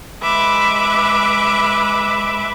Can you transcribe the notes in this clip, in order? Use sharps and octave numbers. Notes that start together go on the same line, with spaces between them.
G#3 B4 E5 D6